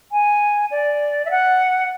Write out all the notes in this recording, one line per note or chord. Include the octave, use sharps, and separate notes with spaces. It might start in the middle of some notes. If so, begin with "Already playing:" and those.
G#5
D5
E5
F#5